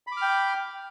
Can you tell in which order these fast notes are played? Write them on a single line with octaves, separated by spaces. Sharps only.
B5 D6 F6 G5